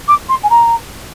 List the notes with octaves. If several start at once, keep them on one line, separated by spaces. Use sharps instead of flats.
D6
C6
G#5
A#5